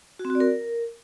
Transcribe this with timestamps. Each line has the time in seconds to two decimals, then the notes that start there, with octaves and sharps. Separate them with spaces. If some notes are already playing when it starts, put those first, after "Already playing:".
0.19 F#4
0.25 C4
0.30 F#4
0.35 D5
0.40 A#4